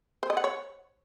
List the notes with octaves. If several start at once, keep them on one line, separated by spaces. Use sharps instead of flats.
C5
D#5
F#5
C#5